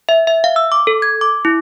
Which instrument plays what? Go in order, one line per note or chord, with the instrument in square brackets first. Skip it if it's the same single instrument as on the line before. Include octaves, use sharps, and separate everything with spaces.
[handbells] E5
E5
F5
E6
D6
A4
G#6
D6
E4